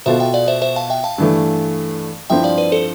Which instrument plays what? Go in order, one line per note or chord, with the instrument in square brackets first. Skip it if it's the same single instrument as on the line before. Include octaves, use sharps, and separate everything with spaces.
[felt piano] B2 B3 F4 A4 [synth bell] C5 E5
[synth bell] E5 G5
D5 F5
C5 E5
C5 E5
F5 A5
E5 G5
F5 A5
[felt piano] G2 E3 A3
[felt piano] G2 F3 C4 E4 [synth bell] E5 G5
[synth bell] D5 F5
B4 D5
A4 C5